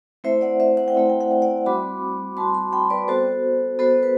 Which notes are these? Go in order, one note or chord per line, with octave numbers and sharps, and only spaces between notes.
A3 C4 E4 C5 E5
D5 F#5
C5 E5
F#5
G5
A3 C4 E4 F#5
G5
F#5
G5
D5 F#5
G3 C4 F#4 B5 D6
G3 C4 F#4 A5 C6
A5 C6
G5 B5
B4 D5
B3 F#4 A4 C5
B3 F#4 A4 C5
B4